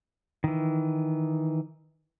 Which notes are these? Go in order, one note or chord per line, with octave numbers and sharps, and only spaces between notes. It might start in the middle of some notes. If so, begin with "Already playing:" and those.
D#3 E3